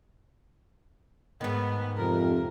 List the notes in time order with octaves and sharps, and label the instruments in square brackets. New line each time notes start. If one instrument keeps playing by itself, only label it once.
[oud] G#2 D#3 [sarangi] B3
[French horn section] F2 C3 [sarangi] A#4